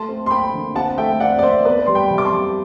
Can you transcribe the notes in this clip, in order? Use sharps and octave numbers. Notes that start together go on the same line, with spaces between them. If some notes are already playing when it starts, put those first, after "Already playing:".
Already playing: A3 A5 C6
C4
C6
C4 G5 B5
D3
C4 F#5 A5
A3 E5 G5
C4 D5 F#5
D5
C4 C5 E5
B3 B4 D5
G3 C6
G5 B5
C3
D6
A5 C6
G3